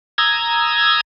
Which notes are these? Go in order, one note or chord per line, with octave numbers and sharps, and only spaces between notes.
A#5 D#6 E6 G#6